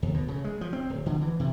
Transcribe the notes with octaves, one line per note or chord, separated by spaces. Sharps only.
D2
B2
C#3
G#3
F3
C4
D1
D3
E3
C3